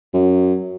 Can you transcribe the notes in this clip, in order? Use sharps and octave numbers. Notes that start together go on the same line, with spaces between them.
F#2